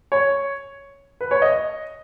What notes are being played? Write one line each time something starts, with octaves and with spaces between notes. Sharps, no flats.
C#5
B4
C#5
D#5